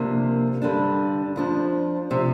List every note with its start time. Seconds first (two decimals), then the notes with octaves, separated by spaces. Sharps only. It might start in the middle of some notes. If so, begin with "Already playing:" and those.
Already playing: F2 C3 A#3 D4
0.62 G2 D3 G3 D4
1.36 F2 F3 D4
2.11 C3 F3